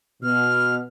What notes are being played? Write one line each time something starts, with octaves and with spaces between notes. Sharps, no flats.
B2 F6